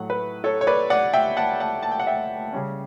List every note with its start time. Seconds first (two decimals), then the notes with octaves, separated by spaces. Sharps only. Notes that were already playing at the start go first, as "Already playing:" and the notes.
Already playing: A2 F#3 A3 F#5
0.10 B4
0.44 A4 C#5
0.61 C#5
0.67 B4 D5
0.90 D5 F#5
1.13 E5 G5
1.37 F#5 A5
1.60 F#5 A5
1.83 A5
1.91 G5
2.00 F#5
2.07 E5 G5
2.53 C#3 G3 C#4